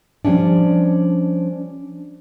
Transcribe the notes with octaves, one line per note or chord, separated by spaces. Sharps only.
F3 G3 A#3 C#4 D4